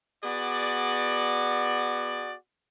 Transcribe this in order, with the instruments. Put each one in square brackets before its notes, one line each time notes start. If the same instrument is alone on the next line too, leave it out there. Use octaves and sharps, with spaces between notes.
[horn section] B3 F#4 G#4 D5